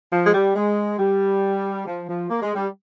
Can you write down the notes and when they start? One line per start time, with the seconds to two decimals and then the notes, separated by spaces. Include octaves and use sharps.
0.12 F3
0.26 G#3
0.34 G3
0.56 G#3
0.99 G3
1.87 F3
2.08 F3
2.30 A#3
2.42 G#3
2.55 G3